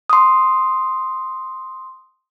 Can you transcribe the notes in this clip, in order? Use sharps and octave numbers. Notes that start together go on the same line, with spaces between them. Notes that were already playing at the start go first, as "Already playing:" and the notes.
C6 D#6